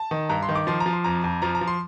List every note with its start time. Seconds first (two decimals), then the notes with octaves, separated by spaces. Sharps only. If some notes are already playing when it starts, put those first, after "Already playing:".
Already playing: A5
0.11 D#3
0.29 G2 A#5
0.42 C6
0.49 D#3
0.55 D6
0.67 F3 C6
0.80 A#5
0.86 F3
0.93 C6
1.04 F2 A#5
1.24 F2
1.42 F3 A#5
1.55 A#5
1.61 F3
1.68 C6